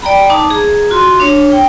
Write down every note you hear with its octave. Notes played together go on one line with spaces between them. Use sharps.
D5 G5 A#5 B5
D#4 A5 D6
G#4 A#5
F4 F#4 C6
D4 C#5
G5